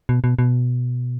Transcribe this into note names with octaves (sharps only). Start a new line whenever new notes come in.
B2
B2
B2